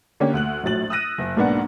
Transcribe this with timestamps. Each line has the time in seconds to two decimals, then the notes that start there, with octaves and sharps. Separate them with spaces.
0.20 D3 A#3 C#4 G4
0.34 D2 F#6 F#7
0.63 A#1 A2 F#3 A6 F#7
0.90 D#6 E6 F#6 A#6 D#7
1.18 F#1
1.36 B1 G#2 A#3 B3 D4 F#5